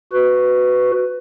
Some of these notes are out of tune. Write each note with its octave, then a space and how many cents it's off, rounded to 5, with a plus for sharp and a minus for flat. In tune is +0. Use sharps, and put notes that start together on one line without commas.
F#4 +0 B4 +15